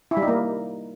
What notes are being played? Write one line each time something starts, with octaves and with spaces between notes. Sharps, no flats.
E4
G3
D#4
A#3